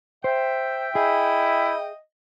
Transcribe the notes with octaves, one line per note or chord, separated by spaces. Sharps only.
C5 E5 G5
E4 G#4 D#5